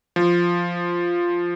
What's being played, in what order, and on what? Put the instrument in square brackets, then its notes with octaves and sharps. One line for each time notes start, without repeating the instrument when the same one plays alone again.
[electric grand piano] F3